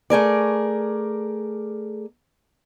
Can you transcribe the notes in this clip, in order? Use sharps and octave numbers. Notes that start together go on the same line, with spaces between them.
A3 G#4 A#4 D5